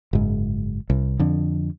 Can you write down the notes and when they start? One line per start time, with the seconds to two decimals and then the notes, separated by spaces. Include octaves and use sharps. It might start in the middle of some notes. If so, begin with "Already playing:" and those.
0.13 F#1 G#2
0.90 C2
1.19 F2 D3